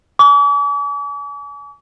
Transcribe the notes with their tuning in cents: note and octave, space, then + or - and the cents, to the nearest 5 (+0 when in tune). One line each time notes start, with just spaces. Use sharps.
G#5 +25 D6 -45